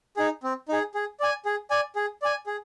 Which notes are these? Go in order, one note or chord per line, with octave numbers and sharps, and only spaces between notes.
D#4 G#4
C4
D#4 G#4
G#4
D5 G#5
G#4
D5 G#5
G#4
D5 G#5
G#4